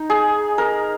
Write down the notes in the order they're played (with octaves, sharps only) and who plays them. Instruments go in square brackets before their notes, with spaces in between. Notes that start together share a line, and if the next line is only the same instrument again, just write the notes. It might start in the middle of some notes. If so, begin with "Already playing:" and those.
Already playing: [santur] D#4
G#4
A#4